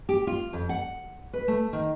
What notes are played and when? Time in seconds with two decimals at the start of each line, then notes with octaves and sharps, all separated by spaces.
0.09 G4
0.27 F4
0.53 F2
0.69 F#5
1.33 B4
1.48 A3
1.73 D#3